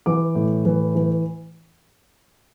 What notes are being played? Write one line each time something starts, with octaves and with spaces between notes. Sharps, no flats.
E3 D6
A2
E3
E3